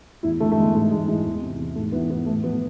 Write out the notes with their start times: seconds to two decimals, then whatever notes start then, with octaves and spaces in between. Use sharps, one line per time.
0.23 E2 E4
0.40 D3 A3
0.52 A3
0.57 E2 G#3
0.74 G#2 A3
0.90 E3 G#3
1.08 E3 G#3
1.25 E2
1.42 C3
1.59 E2
1.75 G#2 A3
1.92 E3 B3
2.10 E3 B3
2.26 A2 A3
2.44 F3 B3